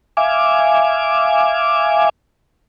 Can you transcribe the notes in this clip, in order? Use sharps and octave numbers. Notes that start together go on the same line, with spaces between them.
E5 F5 G#5 D6